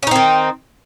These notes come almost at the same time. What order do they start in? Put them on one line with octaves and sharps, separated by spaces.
C#4 D#4 C4 D#3